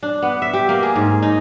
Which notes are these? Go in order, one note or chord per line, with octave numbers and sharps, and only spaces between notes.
D4
B3
E5
G4
A#3
G#4
G#2
D#4